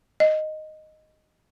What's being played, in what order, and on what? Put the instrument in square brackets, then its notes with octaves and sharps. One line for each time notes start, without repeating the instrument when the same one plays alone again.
[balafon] D#5